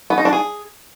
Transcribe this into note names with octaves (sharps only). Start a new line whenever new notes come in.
B3
D#4
D4
G#4